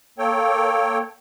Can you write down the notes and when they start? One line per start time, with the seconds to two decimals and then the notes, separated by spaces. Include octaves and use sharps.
0.18 A#3 A4 C#5 G5